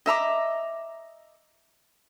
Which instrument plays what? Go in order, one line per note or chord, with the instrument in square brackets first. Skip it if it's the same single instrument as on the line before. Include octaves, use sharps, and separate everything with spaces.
[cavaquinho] D#5 E5 A#5 D6